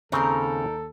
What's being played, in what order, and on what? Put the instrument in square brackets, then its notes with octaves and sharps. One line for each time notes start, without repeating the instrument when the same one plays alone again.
[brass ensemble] D#2 A4 [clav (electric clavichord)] C#3 C4 [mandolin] D#4 A#4